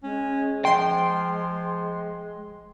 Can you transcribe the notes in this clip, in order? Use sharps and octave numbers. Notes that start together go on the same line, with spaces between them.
G#3 C#4
F3 G5 C6